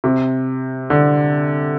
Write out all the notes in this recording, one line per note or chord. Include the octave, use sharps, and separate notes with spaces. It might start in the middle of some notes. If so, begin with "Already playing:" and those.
C3
D3